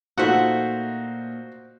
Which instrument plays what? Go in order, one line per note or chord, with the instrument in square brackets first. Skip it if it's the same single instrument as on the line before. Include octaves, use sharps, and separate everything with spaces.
[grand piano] A#2 A3 D#4 [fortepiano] F4 F#4 C5 [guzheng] E5 F#5